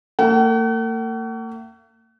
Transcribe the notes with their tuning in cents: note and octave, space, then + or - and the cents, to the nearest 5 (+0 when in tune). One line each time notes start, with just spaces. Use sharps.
A#3 -45 F#5 +45